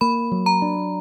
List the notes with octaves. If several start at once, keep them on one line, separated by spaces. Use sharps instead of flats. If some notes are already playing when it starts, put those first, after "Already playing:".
A#3 B5
F#3
A#5
D4